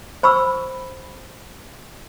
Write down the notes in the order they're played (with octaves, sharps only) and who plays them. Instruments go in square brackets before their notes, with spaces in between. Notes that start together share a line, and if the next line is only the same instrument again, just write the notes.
[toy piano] C5 B5 C#6 E6